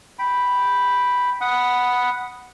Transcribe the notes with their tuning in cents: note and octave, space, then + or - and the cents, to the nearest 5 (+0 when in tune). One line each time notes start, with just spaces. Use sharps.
G5 +0 B5 +0
F#5 +0 B5 +0 D#6 +0